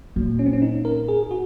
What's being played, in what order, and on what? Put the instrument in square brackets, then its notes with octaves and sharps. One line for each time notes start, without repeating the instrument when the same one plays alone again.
[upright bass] A#2 [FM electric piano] F#3
[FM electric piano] C#4
C4
C#4
D#4
A#4
G#4
G#4
F#4